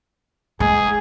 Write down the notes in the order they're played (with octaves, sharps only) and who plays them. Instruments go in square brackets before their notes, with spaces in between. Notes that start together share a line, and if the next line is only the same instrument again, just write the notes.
[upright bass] G#3 [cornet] G#4